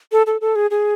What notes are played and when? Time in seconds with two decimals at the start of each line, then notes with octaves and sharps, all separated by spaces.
0.12 A4
0.27 A4
0.41 A4
0.56 G#4
0.71 G#4